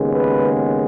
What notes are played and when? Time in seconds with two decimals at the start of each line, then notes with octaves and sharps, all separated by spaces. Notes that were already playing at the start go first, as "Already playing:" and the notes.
Already playing: D#2 C#3 G#3 B3
0.12 B4